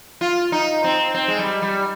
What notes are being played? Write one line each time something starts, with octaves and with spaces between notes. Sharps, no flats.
F4
D#4
C4
C4
G#3
G3
G3